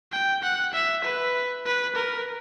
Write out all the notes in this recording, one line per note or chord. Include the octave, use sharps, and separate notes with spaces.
G5
F#5
E5
B4
B4
A#4